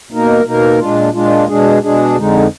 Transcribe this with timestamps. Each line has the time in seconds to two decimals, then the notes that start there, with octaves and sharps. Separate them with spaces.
0.11 B2 A#3 D#4 A#4
0.44 B2 A#3 D#4 A#4
0.78 A#2 G#3 D4 F4
1.13 A#2 G#3 D4 F4
1.48 B2 G#3 D4 G#4
1.82 B2 G#3 D4 G#4
2.17 F2 D3 G#3 D#4